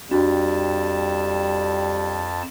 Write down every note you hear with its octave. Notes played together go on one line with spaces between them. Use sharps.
F2 G3 D4 F#4 A5